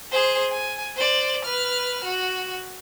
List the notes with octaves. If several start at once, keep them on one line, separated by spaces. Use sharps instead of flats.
G#4 C5
G#5
C5 D5
B4 F6
F#4